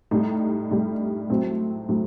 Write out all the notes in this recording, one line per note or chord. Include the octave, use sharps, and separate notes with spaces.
A2 G3 D#4
A2 G3
A2 F#3 C4
A2 F#3